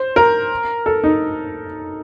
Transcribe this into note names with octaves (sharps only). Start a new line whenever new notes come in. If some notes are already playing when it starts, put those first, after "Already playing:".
Already playing: C5
A#4
A4
D#4